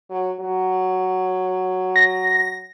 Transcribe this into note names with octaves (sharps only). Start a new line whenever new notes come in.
F#3
F#3
A#6